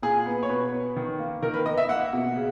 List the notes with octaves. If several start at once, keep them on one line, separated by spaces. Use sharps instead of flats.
A#2 G#4
B3
C#5
B2 B4
B3
D#3
A#3
D#3 A#4
B4
B3 D#5
E5
A#3 F#5
B2
C#3